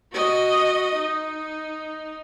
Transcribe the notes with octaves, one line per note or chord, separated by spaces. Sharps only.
F#4 D#5
D#4